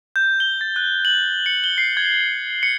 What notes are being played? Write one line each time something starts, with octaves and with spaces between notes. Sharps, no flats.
G6
G7
A6
F#6
F#7
C#7
G7
C7
G#6
C#7